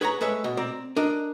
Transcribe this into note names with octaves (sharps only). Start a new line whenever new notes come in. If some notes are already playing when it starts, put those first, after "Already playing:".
G#4 B4 C#5 F#5 A5 A#5
G#3 A3 B4 C#5 E5
B2
C4 D5 A#5
D4 A#4 D#5